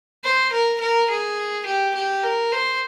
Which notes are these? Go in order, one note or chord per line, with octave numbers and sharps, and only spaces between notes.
C5
A#4
A#4
G#4
G4
G4
A#4
C5